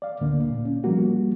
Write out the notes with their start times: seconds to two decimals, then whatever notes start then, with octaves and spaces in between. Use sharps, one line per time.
0.02 D5 F5
0.21 D2 A2 D3 A#3
0.49 A#2
0.65 C#4
0.84 F3 G3 A#3 F#4